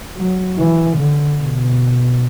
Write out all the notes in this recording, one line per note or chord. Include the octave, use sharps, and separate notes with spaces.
F#3
E3
D3
B2